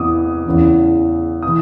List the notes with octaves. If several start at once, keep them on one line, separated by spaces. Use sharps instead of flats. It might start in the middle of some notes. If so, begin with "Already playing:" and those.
Already playing: E2 C3 E3 D6 D#6
E2 C#3 E3
C3 E3 D#6